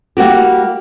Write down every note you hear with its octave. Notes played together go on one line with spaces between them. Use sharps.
G3 A#3 F#4 G4